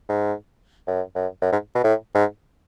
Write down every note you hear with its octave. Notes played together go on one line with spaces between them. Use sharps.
G#2
F#2
F#2
F#2
G#2
B2
A2
G#2